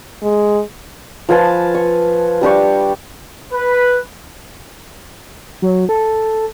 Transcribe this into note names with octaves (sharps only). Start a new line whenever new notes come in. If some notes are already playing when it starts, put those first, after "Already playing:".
G#3
F3 B4 G#5 A5
C#6
G3 D4 G4 C#6
B4
F#3
A4